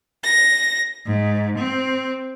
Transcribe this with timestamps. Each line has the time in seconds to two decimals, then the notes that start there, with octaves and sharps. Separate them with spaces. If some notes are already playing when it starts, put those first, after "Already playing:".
0.25 A#6
1.06 G#2
1.58 C4